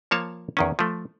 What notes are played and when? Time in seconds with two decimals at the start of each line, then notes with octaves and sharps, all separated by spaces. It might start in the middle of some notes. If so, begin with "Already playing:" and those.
0.11 F3 A#3 C#5 A5
0.57 E2 D#3 C#4
0.79 F3 A3